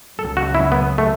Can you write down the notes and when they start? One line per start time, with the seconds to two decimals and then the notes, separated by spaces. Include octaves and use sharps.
0.18 C#2 C#3 F#3 A4
0.37 F#4
0.55 E4
0.72 B3
0.98 A3